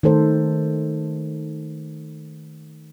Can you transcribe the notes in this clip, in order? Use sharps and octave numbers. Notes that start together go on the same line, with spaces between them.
D#3 A3 A4 C5